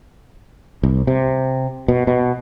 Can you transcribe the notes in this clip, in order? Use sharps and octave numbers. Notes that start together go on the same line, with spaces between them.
C2
C3
B2
B2